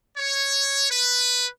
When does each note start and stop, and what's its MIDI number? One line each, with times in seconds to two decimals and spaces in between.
0.17 0.86 73
0.90 1.47 71